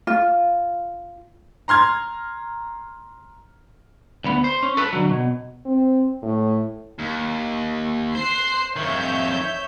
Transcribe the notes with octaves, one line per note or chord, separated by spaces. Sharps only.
F4
A#5 C6 F6 G#6
D2 B3
C5
C#4
A4 B4
D3 F#3
B2
C4
A2
D#2
C5 C6 F#6 C7
F2 D#3 C#5 E5 G6